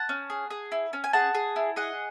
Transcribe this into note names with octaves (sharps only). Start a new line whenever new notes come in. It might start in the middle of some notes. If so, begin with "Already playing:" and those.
Already playing: F#5 A5
C#4
G#4
G#4
E4
C#4
G#5
G#4 F#5 A5
G#4
E4
G#4 D#5 F#5